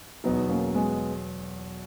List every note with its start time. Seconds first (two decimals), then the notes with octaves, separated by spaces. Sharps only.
0.24 E2 B2 F#3 B3 D#4
0.49 A#3 C#4
0.75 G#3 B3